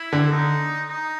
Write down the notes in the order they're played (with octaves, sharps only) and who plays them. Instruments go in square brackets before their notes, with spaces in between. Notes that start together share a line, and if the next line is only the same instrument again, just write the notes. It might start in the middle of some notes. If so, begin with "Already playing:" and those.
Already playing: [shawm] E4
[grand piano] D3
[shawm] D#4
D#4